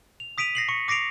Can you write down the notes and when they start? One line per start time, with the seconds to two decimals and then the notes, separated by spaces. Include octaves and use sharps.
0.20 F7
0.38 D#6 B6 D7 D#7 F7
0.55 A#6 C7 F#7
0.69 C#6 C#7
0.88 D6 A#6 C7 D7 F7